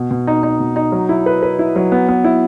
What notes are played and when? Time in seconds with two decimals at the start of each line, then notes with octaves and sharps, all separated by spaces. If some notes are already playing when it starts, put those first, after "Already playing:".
Already playing: B2
0.11 B2
0.27 D#4
0.43 D#4
0.60 B2
0.76 D#4
0.92 F#3
1.09 E4
1.26 B4
1.43 B4
1.59 E4
1.76 F#3
1.92 B3
2.09 B3
2.24 E4